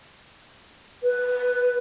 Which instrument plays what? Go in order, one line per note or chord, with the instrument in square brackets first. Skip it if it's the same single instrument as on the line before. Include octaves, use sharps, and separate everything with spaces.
[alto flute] B4